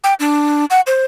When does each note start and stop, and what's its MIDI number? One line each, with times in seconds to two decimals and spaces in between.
0.04 0.14 79
0.20 0.65 62
0.70 0.81 78
0.87 1.05 72